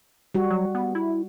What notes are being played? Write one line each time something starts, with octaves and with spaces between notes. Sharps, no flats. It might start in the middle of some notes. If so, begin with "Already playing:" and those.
G3 F#4
F#3
B3
E4